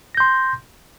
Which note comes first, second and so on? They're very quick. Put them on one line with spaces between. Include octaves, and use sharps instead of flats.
A#6 G6 C6